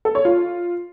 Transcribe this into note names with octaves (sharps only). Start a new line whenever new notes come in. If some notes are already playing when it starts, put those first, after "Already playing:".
A4
C#5
F4